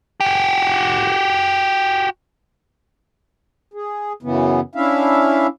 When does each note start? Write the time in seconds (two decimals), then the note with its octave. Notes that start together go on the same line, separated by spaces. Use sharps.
0.20 F#4 G4
3.74 G#4
4.23 F#2 C#3 E3 B3
4.75 C#4 D4 E4 E5 F5